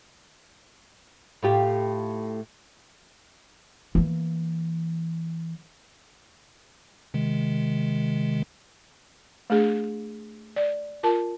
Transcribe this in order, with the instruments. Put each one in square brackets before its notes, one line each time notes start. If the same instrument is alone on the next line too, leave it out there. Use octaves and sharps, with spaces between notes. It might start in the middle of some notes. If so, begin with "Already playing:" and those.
[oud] A2 F4 G4
[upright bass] E3 A#3
[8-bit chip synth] C3 D#3 G#3
[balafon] A3 D4 G#4
D5
F4 A#4 A5